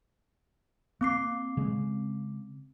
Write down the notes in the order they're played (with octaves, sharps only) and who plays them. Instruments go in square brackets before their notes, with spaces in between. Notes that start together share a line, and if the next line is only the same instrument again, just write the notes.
[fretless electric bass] A#3 [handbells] C4 D6 C7
[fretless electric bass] C#3 G#3